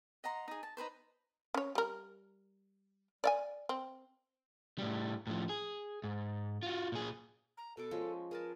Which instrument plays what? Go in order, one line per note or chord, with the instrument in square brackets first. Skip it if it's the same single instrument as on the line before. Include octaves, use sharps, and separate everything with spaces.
[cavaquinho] D#5 F#5 A#5 C6
D#4 G#4
A5
D#4 A4 B4 C5
[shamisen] C#4 C#5
G3 A#4
D5 E5 G#5
C4
[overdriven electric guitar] A2 G3
A2 F3
G#4
G#2
F4 F#4
A#2 G#4
[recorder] A#5
[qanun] B2 B4 D6 [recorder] A4
[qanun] F3 G#3 C#4
[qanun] G#4 B4 A5 [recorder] A#4